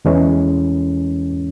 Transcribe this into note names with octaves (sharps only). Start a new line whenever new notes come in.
E2 E3 G#3 C#4